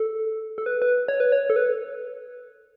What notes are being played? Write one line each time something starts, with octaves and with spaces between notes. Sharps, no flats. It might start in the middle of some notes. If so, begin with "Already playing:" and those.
Already playing: A4
A4
B4
B4
C#5
B4
C#5
A4
B4